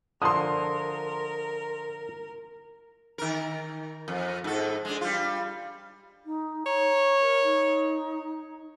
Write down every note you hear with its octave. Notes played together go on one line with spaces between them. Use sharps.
D3 F3 A#4 C6 D#6
D#3 A#4
F2
G#2 A4
G#3 D4
G3 F4
D#4
C#5 A#5
A#4
D#4